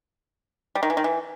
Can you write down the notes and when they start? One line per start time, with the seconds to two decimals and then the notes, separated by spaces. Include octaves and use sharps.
0.75 G3
0.83 D#3
0.90 E3
0.97 D#3
1.04 E3